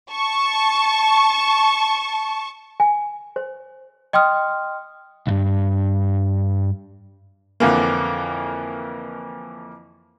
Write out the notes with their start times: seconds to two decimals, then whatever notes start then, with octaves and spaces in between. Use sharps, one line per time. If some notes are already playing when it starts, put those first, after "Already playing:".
0.12 A5 C#6
2.80 G#5
3.36 C5
4.13 D#5 G5 C6 D#6 F6
5.27 C2 G2
7.60 F2 D3 E3 A#3